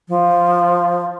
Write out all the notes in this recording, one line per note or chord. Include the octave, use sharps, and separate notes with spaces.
F3